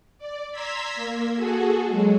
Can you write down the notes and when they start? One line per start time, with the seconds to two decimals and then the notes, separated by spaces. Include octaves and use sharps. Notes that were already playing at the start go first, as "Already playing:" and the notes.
0.18 D5
0.51 A#5 C6 E6 G#6 B6
0.95 A#3
1.36 F#4 G#4 A4
1.86 F#3 G#3